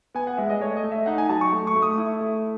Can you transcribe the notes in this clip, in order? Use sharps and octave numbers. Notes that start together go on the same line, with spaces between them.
B3 G#5
F#5
G#3 E5
D#5
A3 C#5
D#5
A3
E5
D#4 F#5
G#5
F#3 A5
C#6
A3
C#6
A3
D#6
E4
A3